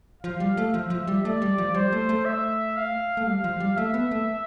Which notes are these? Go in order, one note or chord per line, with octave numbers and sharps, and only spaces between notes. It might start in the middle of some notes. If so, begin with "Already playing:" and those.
F3 F5
G3
A3
F3 E5
F3
G3
A3 D5
G3
F3
G3 C5
A3
A3
E5
F5
A3
G3 F5
F3
G3
A3 E5
B3
A3